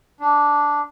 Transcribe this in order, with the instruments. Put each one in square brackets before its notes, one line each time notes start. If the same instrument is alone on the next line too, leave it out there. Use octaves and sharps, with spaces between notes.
[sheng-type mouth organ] D4